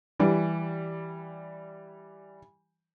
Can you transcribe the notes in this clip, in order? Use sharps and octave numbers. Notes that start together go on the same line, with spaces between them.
E3 G3